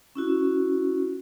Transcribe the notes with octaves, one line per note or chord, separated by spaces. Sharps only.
C#4 E4 F#4